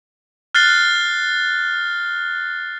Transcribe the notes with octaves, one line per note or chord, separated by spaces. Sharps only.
F6 F#6 A6 C7 G7